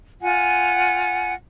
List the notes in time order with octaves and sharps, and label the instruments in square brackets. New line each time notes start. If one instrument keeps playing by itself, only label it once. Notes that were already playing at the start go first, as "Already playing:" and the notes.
[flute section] F4 F#5 G#5